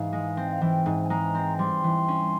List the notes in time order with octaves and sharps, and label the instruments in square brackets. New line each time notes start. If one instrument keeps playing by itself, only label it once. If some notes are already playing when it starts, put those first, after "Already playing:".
Already playing: [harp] G#2 E3 [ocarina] F5
[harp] G#3
C4
[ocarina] F5
[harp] E3 [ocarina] G5
[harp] G#2 [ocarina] G#5
[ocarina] G#5
[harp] G#3 [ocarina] A#5
[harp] C4
[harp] G3 [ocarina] C6
[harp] E3
C#4